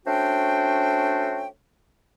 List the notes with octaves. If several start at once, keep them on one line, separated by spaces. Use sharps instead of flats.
A3 C#4 D4 F#4 C5 G5